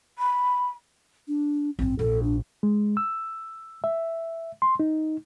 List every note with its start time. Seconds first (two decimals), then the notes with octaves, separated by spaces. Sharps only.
0.18 B5
1.28 D4
1.79 A1 G2 C4
1.99 A#1 G#2 A4
2.23 D4
2.63 G#3
2.97 E6
3.84 E5
4.62 C6
4.80 D#4